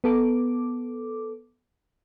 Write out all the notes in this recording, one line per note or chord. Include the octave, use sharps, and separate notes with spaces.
B3 A4 D6